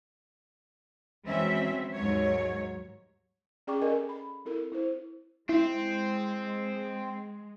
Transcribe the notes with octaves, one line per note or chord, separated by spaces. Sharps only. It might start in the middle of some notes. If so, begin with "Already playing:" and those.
E3 F#3 G#3 C4 C#4 E5
D#2 G#2 F#3 C#5
C#4 G#4 D5 G5 C#6 D6
A4 A#4 D5 D#5 G#5
B5
C4 E4 A4 A#4
E4 C5
G#3 C4 E4